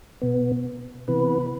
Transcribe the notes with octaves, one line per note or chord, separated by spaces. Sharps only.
B2 B3
C3 E3 B3 B4